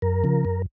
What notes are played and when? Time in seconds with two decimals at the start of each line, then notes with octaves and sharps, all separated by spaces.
0.02 F#2 A#4
0.24 C#3 F3
0.45 F#2